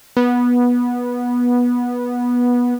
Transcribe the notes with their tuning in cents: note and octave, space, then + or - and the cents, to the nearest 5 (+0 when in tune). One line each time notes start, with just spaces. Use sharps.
B3 -15